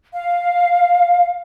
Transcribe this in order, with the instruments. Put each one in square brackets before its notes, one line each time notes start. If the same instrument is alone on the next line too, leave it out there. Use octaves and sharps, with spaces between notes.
[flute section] F5